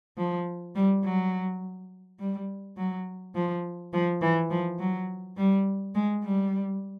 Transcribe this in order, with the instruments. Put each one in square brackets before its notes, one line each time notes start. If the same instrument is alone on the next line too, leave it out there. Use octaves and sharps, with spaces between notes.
[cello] F3
G3
F#3
G3
F#3
F3
F3
E3
F3
F#3
G3
G#3
G3